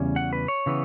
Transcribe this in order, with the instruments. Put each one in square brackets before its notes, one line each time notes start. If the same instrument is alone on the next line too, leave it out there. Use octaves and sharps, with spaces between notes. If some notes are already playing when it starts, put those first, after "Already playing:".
Already playing: [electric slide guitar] E2 C#3 G3 C#4
F#5
B4
C#5
C#3 E3 B3